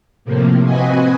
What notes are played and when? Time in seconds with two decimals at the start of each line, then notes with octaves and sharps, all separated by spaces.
0.25 A2 C3 F3 A#3
0.64 C4 F#4 B4 D#5 G#5